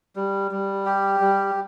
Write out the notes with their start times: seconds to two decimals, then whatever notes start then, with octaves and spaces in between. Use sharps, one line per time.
0.16 G3
0.51 G3
0.86 G4
1.20 G3